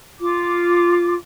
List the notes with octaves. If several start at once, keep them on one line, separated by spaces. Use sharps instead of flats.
F4 D6